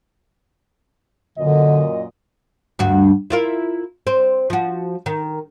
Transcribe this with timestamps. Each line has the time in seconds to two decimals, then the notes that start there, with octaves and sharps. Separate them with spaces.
1.38 F#2 A#2 D3 D#5
2.79 D2 G2 F#4
3.30 E4 F4 A#4
4.07 C4
4.50 F3 F#4
5.06 D#3